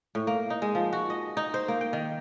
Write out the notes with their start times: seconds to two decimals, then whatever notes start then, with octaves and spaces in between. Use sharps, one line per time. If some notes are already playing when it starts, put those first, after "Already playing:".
0.15 A2
0.27 A#3
0.50 D#4
0.62 G#3
0.75 F3
0.93 F#4
1.10 D#5
1.37 D#4
1.54 C5
1.68 A#3
1.81 G5
1.93 D#3